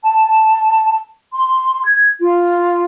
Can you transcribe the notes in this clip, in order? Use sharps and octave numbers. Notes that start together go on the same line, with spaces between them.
A5
C6
G#6
F4